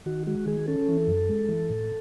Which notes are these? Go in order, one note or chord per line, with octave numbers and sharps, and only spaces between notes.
D#3 F#4
G#3 F#4
D#3 G#4
C#4 A4
E3
F#2
G#3
E3
A2